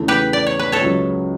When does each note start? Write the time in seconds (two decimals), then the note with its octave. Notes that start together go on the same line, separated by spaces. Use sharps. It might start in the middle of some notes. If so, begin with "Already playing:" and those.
Already playing: E2 C#3 E3 A3 E4
0.08 G4 B4
0.33 D5
0.46 C#5
0.59 B4
0.72 A4 C#5
0.81 C#2 C#3 F#3